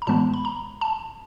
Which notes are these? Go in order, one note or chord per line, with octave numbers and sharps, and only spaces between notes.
A#5
A2 E3 G#3 B3 A5
B5
A#5
A5